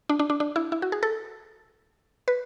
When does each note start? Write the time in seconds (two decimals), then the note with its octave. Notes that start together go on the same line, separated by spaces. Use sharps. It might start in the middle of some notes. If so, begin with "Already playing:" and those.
0.09 D4
0.19 D4
0.30 D4
0.40 D4
0.56 E4
0.72 E4
0.82 F#4
0.92 G#4
1.03 A4
2.28 B4